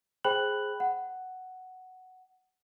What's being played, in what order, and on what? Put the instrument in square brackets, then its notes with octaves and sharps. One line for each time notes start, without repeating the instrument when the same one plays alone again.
[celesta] G#4 C5 G5 B5 F#6 F#7
F#5